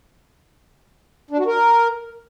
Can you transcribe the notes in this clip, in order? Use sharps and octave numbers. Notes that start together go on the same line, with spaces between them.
D4
F#4
A#4